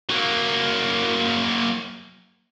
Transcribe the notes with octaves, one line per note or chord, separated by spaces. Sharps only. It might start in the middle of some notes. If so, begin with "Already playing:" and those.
F#3 A#3